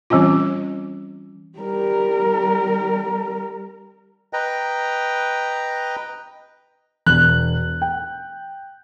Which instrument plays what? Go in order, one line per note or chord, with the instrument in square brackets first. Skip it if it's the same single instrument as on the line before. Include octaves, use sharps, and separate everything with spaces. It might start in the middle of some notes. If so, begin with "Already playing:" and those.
[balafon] E3 G3 C4 C#4 F4
[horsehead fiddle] G3 A#4
[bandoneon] B4 D#5 G5 A#5
[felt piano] E1 [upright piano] F#6
[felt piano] G5